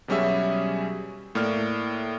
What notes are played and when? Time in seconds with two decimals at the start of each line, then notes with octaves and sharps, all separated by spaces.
0.08 B2 F#3 G3 C#4 G#4 E5
1.35 A2 A#3 D5 F6